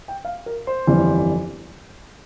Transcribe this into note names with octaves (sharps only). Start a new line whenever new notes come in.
G5
F5
A#4
C5
G1 F2 E3 G3